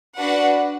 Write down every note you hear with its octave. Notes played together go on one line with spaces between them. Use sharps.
D4 F#4 B4 F#5